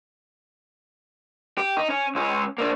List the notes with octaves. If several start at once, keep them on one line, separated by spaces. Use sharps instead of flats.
G4
D#4
C#4
C#2 C#4
A#3 D4